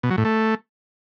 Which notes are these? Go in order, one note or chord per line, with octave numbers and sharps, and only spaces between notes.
B2
F#3
A2
A3